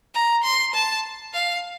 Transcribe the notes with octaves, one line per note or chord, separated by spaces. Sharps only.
A#5
C6
A5
F5